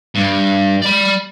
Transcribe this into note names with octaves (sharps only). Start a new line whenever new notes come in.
G2
D5 B5